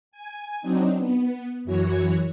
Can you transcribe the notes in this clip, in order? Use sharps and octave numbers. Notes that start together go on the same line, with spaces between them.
G#5
F#3 C4 D4 D#4
B3
F#2 E3 F#3 F#4 C#5 G#6